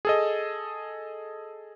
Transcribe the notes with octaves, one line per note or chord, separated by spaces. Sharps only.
G#4 A4 D#5